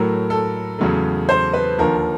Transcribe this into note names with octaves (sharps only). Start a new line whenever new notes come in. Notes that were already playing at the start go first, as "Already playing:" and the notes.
Already playing: A2 F#3 A3 A#4
A4
E2 C#3 F#3 A3
C5
B4
D#2 D3 F3 A#4